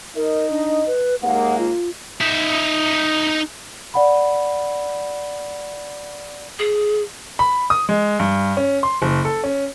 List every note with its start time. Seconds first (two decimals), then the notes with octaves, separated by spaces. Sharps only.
0.16 D#4 A#4 D#5
0.50 D4
0.86 B4
1.22 D#2 G#3 A#3 F#5
1.59 F4
2.21 D#4 E5
3.94 D5 F#5 B5
6.59 G#4
7.39 B5
7.70 D#6
7.89 G#3
8.20 G2
8.57 C#4
8.83 C6
9.02 F#1
9.25 A4
9.44 C#4